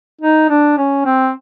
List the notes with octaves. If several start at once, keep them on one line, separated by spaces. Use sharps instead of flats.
D#4
D4
C#4
C4